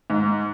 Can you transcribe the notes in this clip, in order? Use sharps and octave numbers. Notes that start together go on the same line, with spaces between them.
G#2